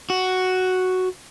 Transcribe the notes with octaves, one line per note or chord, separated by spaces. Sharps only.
F#4